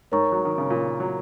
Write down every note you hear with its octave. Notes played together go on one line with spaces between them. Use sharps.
G#2 A#4 C#5 A#5 C#6
F#3
D#3
C#3
A#2
F#3